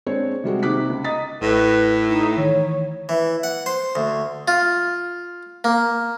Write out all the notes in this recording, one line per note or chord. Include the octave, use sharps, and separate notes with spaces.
G#3 C4 D4 C5 C#5
C3 G3 G#3 F#4
C3 D#3 D#4 D6 F#6 B6
C#2
D#5 A#5 D#6 A6 B6
A1 A2 B4 A#6
D#4
D#3 E3 C#5
E3
F#5
C5
D2
F4
A#3